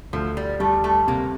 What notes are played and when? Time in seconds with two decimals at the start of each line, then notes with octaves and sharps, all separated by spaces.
0.13 D2 F3
0.37 G3
0.60 G3 A3
0.84 A3
1.08 C3 A#3